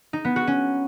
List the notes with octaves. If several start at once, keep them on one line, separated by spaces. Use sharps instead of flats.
D#4
B3
F#4
C#4